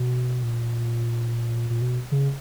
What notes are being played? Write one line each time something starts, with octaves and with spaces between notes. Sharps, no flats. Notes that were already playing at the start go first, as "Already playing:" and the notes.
Already playing: B2
A#2
A#2
B2
C#3